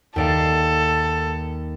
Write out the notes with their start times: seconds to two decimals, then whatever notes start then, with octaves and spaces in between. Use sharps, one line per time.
0.16 D#2 A4 D5 F5